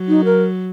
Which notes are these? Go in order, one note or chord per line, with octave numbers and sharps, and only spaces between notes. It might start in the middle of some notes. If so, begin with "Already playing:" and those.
Already playing: F#3
D#4
A#4